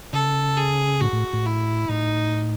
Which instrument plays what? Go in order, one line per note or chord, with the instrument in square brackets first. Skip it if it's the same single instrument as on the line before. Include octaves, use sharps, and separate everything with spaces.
[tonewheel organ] C#3 [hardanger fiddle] A4
[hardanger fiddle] G#4
[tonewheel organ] A2 [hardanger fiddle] F#4
[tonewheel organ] A2
A2
[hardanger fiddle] E4
[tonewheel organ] A2 [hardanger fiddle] D#4